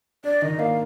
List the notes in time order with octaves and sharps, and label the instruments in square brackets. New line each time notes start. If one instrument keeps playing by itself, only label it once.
[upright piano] D4 [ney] D5
[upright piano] D#3 [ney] D#5
[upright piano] A#3 [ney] F5